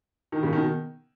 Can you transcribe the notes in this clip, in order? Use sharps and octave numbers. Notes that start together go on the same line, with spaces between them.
D#3
C#3
B2 D#3